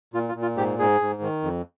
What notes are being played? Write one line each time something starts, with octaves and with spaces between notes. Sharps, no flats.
A#2 F4
F4
A#2
F4
G#2 G4
G#2 G#4
G#2
D#3
F2